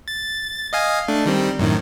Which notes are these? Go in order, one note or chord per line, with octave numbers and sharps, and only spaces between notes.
A6
D#5 F5 G#5
A3 D4
D#3 G3 C4
F#2 A2 D#3